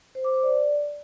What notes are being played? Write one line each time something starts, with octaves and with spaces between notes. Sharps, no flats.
C5
D6
C5
D5